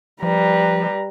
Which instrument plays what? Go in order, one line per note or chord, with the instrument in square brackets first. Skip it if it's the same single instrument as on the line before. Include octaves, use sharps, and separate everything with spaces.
[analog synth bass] F3 [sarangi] G3 [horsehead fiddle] B4 A#5